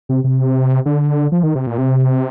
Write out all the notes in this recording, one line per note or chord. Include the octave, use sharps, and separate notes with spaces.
C3
C3
D3
F3
D#3
C3
A#2
C3